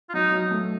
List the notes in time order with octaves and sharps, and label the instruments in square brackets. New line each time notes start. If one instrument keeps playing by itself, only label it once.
[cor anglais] F4
[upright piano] F#3 [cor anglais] D#4
[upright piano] F#3
A3